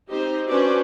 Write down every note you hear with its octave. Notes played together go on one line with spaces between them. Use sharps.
C4 D#4 G4 C5
C#4 D4 F#4 B4 C5 D5